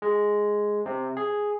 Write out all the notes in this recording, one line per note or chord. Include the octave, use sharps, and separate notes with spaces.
G#3
C3
G#4